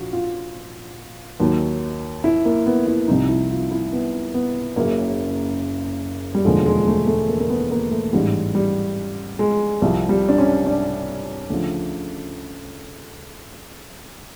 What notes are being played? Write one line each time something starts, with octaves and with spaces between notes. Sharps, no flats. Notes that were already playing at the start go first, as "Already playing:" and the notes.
Already playing: A#1 A#2 F3 F#4
F4
D#2 D#3 F#3
E4
A#3
B3
E4
C2 C3 F3 D#4
E4
F4
E4
B3
B3
F#1 F#2 C#3 F#3 A#3
G3
E1 D#2 D3 F3 G#3
G#3
A3
A3
A#3
A#3
B3
A#3
A3
A1 G#2 E3 G3
G3
G#3
C2 C3 F3
G3
D4
C#4
D4
D2 C#3 F3